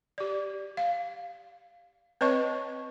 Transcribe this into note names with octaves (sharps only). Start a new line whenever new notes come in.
G4 D5
F5
C4 B4 C#5 D#5 A5 C#6